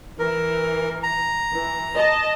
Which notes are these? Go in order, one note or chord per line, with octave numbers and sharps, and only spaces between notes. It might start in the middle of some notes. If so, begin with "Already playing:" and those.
E3 A#4
A#5
E3
D#5 A5